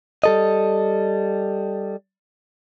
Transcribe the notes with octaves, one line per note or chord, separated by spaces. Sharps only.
G3 A4 D#5